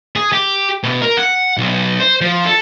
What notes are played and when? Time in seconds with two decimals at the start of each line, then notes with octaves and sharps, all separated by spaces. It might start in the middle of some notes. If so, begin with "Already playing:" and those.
0.16 G#4
0.33 G4
0.83 B2
1.01 A#4
1.17 F#5
1.58 B1
2.00 C5
2.21 F3
2.46 A4